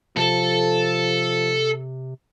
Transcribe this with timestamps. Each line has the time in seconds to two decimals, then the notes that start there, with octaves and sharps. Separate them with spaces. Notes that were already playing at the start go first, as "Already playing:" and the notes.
0.17 C3 F3 A4